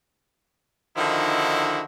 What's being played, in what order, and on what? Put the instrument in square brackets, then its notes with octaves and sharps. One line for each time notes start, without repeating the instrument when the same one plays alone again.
[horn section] D3 D#3 F3 D#4 E4 F#4